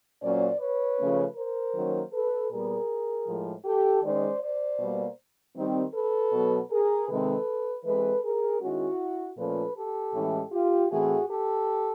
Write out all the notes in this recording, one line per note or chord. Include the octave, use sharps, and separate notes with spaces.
A#2 F#3 A#3 C#4 C5 D5
B4 C#5
C#3 F3 A3 C#4
A#4 C5
D#3 F#3 A#3 C#4
A4 B4
A#2 G3 B3 G#4 A#4
A2 F3 G#3
G4 A4
D#3 G#3 C#4 C5 D5
C5 D5
B2 G3 A#3
D#3 G3 C4
A4 B4
B2 F#3 B3
G#4 A#4
C3 D#3 G#3 C4 A4 B4
E3 G#3 C4 A4 B4
G#4 A#4
D#3 G#3 C#4 E4 F#4
A#2 F3 A3 C#4 A4 B4
G4 A4
A2 E3 G#3 C#4
F4 G4
A2 E3 A3 C4 F#4 G#4
G4 A4